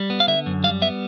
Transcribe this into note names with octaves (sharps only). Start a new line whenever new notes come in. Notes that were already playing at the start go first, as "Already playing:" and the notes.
Already playing: G3
B3
F5
D3 E5
F#2
G3 F5
B3 E5